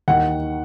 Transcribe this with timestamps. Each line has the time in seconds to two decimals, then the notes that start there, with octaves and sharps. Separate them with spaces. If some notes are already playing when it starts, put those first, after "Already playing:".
0.08 D#2 D#3 F#5